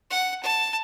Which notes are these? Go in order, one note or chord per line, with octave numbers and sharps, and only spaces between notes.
F#5
A5